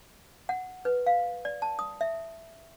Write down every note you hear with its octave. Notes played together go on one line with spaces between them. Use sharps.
F#5
B4
F5
D5
A5
D#6
E5